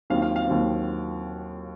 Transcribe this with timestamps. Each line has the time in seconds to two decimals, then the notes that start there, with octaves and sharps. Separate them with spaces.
0.10 D#2 D#3 F#3 C4 F5
0.22 F5
0.36 F5
0.47 D#2 D#3 F#3 C4